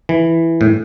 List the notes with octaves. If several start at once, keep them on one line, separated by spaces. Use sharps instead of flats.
E3
A2